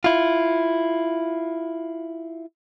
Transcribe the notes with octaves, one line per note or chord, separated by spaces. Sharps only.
E4 F4